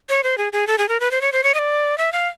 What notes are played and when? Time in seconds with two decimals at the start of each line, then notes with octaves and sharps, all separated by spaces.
0.09 C#5
0.23 C5
0.38 G#4
0.53 G#4
0.67 A4
0.78 G#4
0.89 A#4
1.00 B4
1.11 C5
1.21 C#5
1.32 C5
1.44 C#5
1.54 D#5
1.59 D5
1.98 E5
2.12 F5